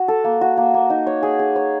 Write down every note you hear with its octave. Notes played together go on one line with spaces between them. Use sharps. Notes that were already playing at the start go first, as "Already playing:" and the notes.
Already playing: F#4
A4
A#3
F#4
A#3
A#3
D#4
C#5
G#4
G#4
C#5